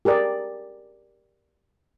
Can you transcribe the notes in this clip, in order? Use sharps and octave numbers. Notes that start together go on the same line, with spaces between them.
G4 G#4 A#4 D5